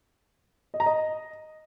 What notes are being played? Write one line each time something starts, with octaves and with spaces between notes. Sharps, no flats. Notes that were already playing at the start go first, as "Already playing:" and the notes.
D#5
A#5
D#5